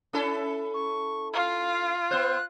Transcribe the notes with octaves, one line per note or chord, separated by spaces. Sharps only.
C#4 E4 A4
C#6
F4 F5
B3 C5 F#6